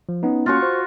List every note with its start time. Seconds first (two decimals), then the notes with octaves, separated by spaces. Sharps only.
0.09 F3
0.23 B3 C#4 D#4
0.46 A#3 C#4 F4 F#4 C#6
0.62 C5